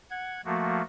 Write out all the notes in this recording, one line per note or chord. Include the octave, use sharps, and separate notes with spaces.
F#5 G#6
F3 A3 A#3 F#4